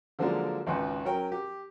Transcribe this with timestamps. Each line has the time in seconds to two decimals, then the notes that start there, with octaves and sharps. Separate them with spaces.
0.19 D3 F3 F#3 G#3 A#3 D4
0.67 G#1 C#2 B4
1.05 F#3 C#4 A#4 G5
1.32 G4